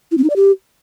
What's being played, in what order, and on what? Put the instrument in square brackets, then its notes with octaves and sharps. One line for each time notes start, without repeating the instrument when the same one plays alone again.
[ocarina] E4
C4
D#4
D5
G4